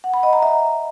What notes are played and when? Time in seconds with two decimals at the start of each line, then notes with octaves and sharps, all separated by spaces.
0.04 F#5
0.14 B5
0.23 D#5
0.33 A#5
0.43 E5